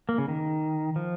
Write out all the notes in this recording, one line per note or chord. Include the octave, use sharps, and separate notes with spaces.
A#3
C#3
D#3
F3